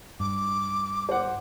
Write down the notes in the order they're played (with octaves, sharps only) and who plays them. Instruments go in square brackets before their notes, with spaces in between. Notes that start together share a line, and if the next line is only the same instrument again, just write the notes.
[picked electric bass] G2 [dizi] D6
[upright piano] C5 F#5